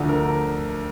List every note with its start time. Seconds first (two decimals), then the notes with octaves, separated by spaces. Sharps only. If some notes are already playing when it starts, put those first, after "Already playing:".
Already playing: D2 D3 F3 A3
0.09 A#4